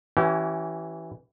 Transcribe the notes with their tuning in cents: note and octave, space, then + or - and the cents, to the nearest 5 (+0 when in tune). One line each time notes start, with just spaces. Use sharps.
E3 +0 C#4 +5 G4 -40